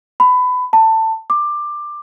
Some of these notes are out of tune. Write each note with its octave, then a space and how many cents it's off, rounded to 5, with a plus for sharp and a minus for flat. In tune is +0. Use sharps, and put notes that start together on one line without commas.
B5 +20
A5 +20
D6 +15